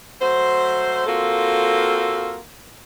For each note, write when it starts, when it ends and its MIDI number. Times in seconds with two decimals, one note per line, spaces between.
0.21 1.03 54
0.21 1.03 57
0.21 1.03 72
1.07 2.38 58
1.07 2.38 60
1.07 2.38 65
1.07 2.38 66
1.07 2.38 69